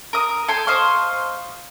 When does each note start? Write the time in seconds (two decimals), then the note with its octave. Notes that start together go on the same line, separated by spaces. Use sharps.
0.13 A#4 D#6
0.48 A4 G5 G#5 C6
0.67 C5 D#5 F5 C#6